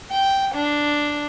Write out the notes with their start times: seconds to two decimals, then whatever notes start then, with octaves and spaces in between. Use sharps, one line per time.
0.12 G5
0.55 D4